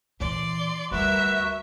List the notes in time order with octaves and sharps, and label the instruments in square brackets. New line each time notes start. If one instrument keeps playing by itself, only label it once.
[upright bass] A#2 E3 [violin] D5 C6
[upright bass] D2 G3 [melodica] F#4 B4 [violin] A#4 E5